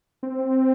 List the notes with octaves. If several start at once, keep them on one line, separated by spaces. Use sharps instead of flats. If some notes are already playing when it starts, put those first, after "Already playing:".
C4